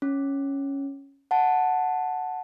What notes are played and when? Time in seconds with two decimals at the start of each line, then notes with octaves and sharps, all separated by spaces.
0.02 C#4
1.31 F#5 A5